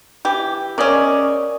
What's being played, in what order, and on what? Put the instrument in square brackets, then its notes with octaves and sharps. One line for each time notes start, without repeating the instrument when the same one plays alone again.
[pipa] E3 G4
[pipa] C#3 C#4 [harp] A#4 D5 D#5